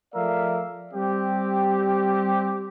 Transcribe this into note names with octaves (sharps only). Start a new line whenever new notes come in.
F3 A3 A#4 D5 E5 F5
G3 C4 G4